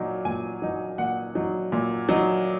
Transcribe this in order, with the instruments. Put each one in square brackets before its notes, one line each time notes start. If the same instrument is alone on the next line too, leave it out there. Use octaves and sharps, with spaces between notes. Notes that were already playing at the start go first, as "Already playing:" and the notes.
Already playing: [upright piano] A#2 F#3 D#4
A#2 G#5
F#3 D#4
A#2 F#5
F#3 D#4
A#2
F#3 D#4